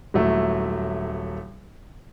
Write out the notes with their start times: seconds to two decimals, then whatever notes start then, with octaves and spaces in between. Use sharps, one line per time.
0.14 D#1 F#3 A3 E4